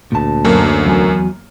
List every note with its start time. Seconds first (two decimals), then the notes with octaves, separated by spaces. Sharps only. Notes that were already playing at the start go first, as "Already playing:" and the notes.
0.12 D2 A#2 A5
0.45 F#2 A#3
0.86 E2 F#3 G#5